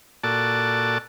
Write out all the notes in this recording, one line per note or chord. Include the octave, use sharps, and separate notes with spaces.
A#2 F#4 A4 D5 A5